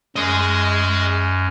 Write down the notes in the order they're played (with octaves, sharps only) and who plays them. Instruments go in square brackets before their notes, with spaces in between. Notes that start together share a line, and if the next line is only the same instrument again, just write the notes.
[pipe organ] F#2 [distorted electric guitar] G#4 D#5